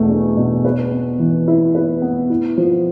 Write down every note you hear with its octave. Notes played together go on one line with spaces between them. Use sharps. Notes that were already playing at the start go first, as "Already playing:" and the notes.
Already playing: E2 B2 A3
D4
B2
B4
B3
E3
E4
B4
B3
E4
F3